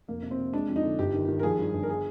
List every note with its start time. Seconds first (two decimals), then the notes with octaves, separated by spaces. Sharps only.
0.08 F1 A#3
0.23 C3
0.31 C4
0.38 C3
0.53 G#3 D4
0.69 F2
0.76 D#4
0.83 D3
0.99 G1 G4
1.14 D#3
1.28 D#3
1.39 A#4
1.43 F3 G#4
1.58 G2
1.73 G1
1.83 A#4
1.89 G#4